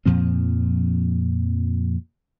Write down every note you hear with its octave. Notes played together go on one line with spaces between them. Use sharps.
F2 A#2 F3 C4